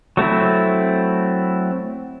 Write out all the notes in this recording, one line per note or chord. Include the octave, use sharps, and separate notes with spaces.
F#3 A3 C4 E4